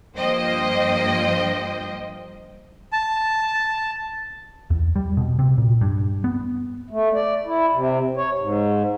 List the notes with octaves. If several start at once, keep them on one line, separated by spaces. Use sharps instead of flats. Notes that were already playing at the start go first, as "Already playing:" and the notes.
G2 F3 A#3 C5 D#5 G5
A5
E2
G3
B2
C3
A#2
G2
B3
A3
D5
E4
C3
C#5
G#2